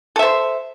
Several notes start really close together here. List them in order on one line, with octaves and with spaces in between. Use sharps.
A4 E5 C5